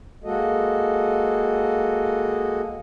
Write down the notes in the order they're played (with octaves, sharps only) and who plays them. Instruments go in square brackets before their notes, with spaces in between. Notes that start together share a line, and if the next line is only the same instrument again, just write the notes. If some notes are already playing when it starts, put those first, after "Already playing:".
[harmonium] G#3 A#3 F#4 A4 D#5